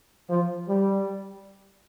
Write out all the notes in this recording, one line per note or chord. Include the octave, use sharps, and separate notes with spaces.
F3
G3